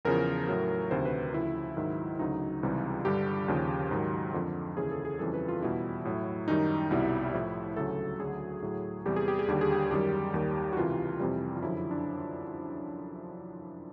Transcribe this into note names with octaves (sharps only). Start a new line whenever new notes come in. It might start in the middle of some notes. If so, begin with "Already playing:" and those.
E2 C#3 F3 A#4
A2 F#3
D2 C3 D#3 C5
B4
D2 C#3 F3 E4
G#2 D#3 F#3
D2 C#3 F#3 D#4
C#2 C3 E3 G3
G2 D3 G3 G4
D#2 C#3 F3
G#2 D#3 F#3
F2 D3 F3
D#2 C#3 E3 G#4
A4
G#4
F2 C#3 E3 G3 A4
B4
F4
E2 B2 G3 E4
A2 F#3
F#2 D#3 G3 D#4
C2 B2 G3 E4
A2 F3
D2 C#3 F#3 A4
D2 D3 F#3 G#4
A2 F#3
E2 C3 E3 G3 G4
G#4
G4
G#4
D#2 D3 G3 G4
G#4
G4
F#2 D#3 G3 G4
D#2 D#3 G3
F#4
C#2 C3 E3 F4
F2 C3 E3 G3
F4
F#2 D3 F3 E4
E4
D4